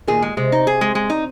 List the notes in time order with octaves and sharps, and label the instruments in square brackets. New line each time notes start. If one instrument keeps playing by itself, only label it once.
[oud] A#2 D#3 [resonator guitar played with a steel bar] G#4
[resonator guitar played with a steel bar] G#3
[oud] C3 [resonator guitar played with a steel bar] G#3
[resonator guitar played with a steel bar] D#4
G#4
G#3
G#3
D#4